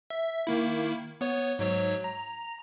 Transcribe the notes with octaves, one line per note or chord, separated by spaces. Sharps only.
E5
D#3 A#3 E4
B3 C#5
G#2 F#3 C#5
A#5